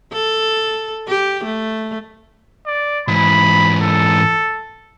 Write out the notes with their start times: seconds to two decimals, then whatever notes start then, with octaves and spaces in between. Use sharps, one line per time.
0.13 A4
1.08 G4
1.44 A3
2.66 D5
3.08 G#2 E3 B5
3.82 A4